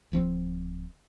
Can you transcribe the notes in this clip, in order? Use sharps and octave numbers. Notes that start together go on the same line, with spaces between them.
D1 F3 C4